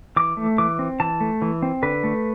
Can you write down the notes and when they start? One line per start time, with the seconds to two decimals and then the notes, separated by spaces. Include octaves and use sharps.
0.16 E3 D6
0.37 A3
0.58 E3 D6
0.79 C4
1.00 E3 A5
1.21 A3
1.42 E3
1.62 C4
1.83 D3 B4
2.04 A3